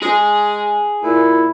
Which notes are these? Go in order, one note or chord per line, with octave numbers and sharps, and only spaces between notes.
G#3 G#4
A#2 E4